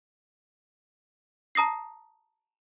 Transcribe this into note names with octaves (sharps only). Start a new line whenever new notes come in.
A5 A#5 D#6 A#6 C7